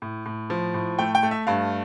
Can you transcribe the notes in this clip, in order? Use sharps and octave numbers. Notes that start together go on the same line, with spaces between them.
A2
A2
F3
A2
A3 G5
G5
A3
E5
G2 F5